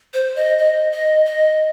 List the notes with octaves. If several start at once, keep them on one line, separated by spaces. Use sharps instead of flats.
C5
D#5
D#5
D#5
D#5